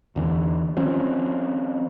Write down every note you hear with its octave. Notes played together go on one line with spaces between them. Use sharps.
E2 D3 E3
D#3 F3 C4 C#4